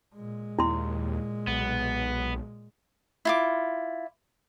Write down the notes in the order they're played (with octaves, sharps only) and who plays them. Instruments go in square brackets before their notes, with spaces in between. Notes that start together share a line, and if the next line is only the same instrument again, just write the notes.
[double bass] A#2 G#3
[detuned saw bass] D#2 [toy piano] E4 C6
[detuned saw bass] B1 [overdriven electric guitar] B3
[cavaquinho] E4 F4 D6